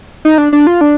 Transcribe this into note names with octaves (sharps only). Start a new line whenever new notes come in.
D#4
D4
D4
F4
D4